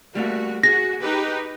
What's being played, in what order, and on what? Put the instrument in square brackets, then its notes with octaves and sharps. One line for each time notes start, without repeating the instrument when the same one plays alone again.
[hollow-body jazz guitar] G3 A3 A#3 [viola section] F#4
[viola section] F#4 [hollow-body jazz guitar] G#4 [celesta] A#6
[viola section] D#4 G4 B4